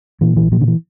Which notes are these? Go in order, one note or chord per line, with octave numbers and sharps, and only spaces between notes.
A#2 E3
A#1 E3
A#2 F3
D3
E3